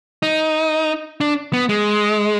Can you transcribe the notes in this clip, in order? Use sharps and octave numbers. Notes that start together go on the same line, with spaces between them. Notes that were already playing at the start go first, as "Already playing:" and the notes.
D#4
D4
B3
G#3